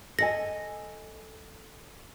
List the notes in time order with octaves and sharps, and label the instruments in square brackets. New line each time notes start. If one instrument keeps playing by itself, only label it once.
[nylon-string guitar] A4 D#5 G#5 [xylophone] A#6